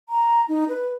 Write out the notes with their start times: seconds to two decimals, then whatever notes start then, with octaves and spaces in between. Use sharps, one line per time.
0.09 A#5
0.48 D#4
0.69 B4